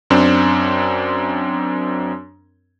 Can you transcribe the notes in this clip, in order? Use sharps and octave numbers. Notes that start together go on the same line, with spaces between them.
F#2 C4 D4